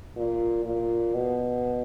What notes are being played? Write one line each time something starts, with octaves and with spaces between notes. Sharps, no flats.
A#2
A#2
B2